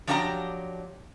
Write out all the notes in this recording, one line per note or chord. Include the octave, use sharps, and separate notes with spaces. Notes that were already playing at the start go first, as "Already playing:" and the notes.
F3 F#3 D4 G4 F5 A#5